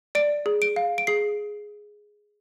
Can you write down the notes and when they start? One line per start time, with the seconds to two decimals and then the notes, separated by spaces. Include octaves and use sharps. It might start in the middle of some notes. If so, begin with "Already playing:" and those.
0.15 D5 D7
0.46 G#4
0.62 D7
0.76 F5
0.98 D7
1.07 G#4 C7